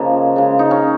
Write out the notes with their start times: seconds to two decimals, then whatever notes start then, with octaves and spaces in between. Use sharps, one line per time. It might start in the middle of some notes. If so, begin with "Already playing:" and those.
Already playing: C#3 F3 G#3 A#3
0.36 C#3 G#3
0.59 D#4
0.71 C#4